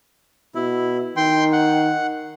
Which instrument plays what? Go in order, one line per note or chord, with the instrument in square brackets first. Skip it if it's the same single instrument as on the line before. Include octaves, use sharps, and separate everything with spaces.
[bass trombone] B2 [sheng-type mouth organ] E4
[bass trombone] D#3 [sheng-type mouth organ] G5 C6
[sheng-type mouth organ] F#5